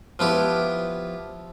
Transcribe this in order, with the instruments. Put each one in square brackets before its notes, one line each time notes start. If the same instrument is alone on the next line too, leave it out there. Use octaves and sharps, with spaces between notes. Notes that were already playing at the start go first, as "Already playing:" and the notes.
[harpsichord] F3 B3 E4 G4